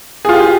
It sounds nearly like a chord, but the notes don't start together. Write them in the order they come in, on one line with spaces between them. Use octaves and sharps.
G#4 F4 G4